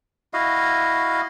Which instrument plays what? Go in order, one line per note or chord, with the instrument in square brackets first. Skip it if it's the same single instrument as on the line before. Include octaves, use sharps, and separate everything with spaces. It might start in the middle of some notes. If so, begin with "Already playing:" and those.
[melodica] E4 F#4 D#5 F5